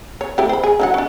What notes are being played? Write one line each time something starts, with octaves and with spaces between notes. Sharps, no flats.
C#5
A3 E4 G4
C5 B5
G#4
D3 F#3 F#5
D4 F#4